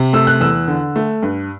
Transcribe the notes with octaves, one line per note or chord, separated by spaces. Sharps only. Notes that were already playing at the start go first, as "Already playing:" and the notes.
Already playing: C3
A3 E6
F#6
E2 E6
D3
A3
G2